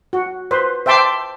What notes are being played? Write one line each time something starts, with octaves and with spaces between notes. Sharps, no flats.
F#4
B4 C5
C5 E5 G5 A5 C6 D6